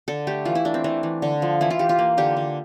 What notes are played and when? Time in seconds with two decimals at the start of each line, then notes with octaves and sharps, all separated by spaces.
0.08 D3 A4
0.27 A3 G4
0.45 E3 F4
0.55 E4
0.65 A3 D4
0.74 C4
0.84 E3 D4
1.03 E3
1.22 D3
1.42 F3
1.61 E3 E4
1.71 F4
1.79 E3 G4
1.89 F4
1.99 A#3
2.17 D3 G4
2.37 D3